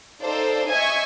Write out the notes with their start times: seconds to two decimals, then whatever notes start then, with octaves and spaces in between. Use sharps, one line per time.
0.21 D#4 A4 C5 D5 F5
0.69 D#5 E5 G#5 C#6 G#6